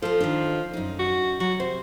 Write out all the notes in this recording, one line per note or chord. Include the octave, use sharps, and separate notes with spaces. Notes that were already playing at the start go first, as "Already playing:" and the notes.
F3 A4 C5
D#3 D4
F#2 D#4
F#4
F#3 F#4
C3 C5